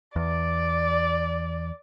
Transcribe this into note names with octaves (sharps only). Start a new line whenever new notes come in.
E2 D5